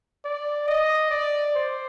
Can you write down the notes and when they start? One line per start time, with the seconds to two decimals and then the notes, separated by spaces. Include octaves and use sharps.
0.25 D5
0.68 D#5
1.11 D5
1.55 C5